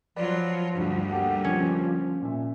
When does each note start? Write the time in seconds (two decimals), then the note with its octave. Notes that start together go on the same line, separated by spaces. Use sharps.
0.16 F3 F#3 F4 B4 D5
0.74 D2 G2 G3 F#4
1.10 A#3 G4 A4 F#5
1.44 F3 C#4
2.22 A#2 E5